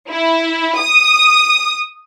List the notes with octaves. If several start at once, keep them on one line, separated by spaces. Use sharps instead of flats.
E4
D#6